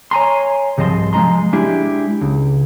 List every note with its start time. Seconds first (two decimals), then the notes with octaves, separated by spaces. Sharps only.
0.11 C#5 G#5 A#5 C6
0.78 C2 G#2 F3 D#5 A5 C6
1.13 F3 G#3 D4 D#5 A#5 C6
1.53 G#3 D4 E4 G4
2.21 C#2